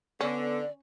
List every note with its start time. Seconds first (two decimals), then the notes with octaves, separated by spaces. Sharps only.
0.21 D3 B3 C#4 D5